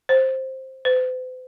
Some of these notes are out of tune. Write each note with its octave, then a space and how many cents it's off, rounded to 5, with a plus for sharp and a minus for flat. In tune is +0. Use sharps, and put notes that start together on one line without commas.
C5 +10
C5 -45